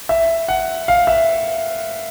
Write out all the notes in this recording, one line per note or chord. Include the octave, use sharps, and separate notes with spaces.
E5
F#5
F5
E5